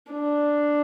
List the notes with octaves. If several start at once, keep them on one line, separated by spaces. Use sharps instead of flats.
D4